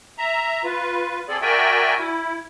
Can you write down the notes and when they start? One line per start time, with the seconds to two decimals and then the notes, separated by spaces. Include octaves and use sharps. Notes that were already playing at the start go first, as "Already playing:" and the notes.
0.18 E5 A#5
0.64 F4 B4
1.28 C4 G#4 A4 D5
1.42 F#4 A#4 D5 E5 G5 G#5
1.99 E4